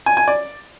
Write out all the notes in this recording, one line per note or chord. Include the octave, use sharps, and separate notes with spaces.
G#5
G#5
D5